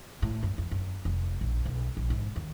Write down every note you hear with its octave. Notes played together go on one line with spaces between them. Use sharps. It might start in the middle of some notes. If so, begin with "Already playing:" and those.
A2
F#2
F2
F#2
F1
A#1
B1
A#1
G#2
D#2